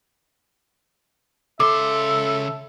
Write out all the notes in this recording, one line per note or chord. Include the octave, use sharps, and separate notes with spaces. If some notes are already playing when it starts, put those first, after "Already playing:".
C#3 A4 E5 C6 D6